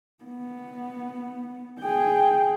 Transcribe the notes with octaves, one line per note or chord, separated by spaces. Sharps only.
B3
G#4 G5